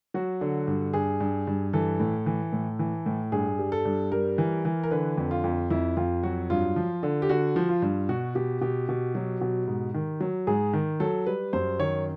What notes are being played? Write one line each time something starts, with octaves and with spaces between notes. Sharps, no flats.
F#3 F#4
D3
G2
G2 G#4
G2
G2
E3 A4
A2
E3
A2
E3
A2
G2 G#4
G3
A4
G2
G3 A#4
E3
E3
A#4
D3 B4
F2
F4
F2
F2 E4
F2 F4
F#3 F#4
G2 F4
F3
D3
G4
D3 F#4
F3
F4
G2
B2 F#4
B2 G4
B2 G4
B2
F#3
B2
G#2
D#3
F#3
G#2 G#4
D#3
F#3 A4
G3 B4
F#2 C5
D#3 C#5